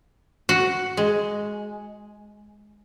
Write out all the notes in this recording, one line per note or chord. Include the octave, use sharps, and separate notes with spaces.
F#4
G#3